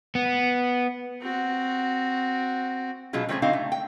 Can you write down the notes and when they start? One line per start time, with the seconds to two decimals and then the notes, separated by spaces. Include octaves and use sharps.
0.15 B3
1.21 C4 F#4
3.13 B2 F#3 G#3 C#4 F4
3.29 G3 A3 C4 C#4 G4 G#4
3.42 D3 C4 D#4 F#4 F5
3.53 A3
3.72 G5